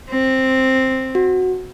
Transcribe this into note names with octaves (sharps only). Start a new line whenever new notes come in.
C4
F#4